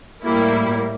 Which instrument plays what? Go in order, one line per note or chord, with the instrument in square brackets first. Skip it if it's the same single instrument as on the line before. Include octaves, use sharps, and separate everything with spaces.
[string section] A2 G3 A#3 E4